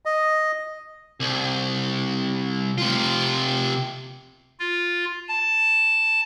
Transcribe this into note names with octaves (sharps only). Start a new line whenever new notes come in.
D#5
C2
C3 F4
F4
A5